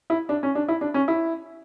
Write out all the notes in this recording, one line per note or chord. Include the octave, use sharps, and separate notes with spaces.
E4
D4
C#4
D4
E4
D4
C#4
E4